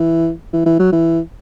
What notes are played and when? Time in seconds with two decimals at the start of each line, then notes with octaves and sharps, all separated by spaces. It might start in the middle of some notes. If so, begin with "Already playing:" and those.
Already playing: E3
0.53 E3
0.66 E3
0.79 F#3
0.92 E3